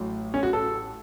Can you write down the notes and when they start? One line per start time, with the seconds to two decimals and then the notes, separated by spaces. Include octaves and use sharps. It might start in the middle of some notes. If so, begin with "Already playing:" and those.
Already playing: A1 A2 F#3
0.34 C#4
0.43 F#4
0.53 A4